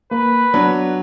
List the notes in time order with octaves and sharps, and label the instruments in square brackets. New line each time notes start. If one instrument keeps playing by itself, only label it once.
[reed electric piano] A#3 [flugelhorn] B4
[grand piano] F#3 [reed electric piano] B3 D4